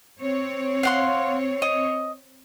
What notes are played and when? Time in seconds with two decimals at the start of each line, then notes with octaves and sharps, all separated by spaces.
0.20 C4 C#5
0.83 F5 F#5 C6
1.62 D#5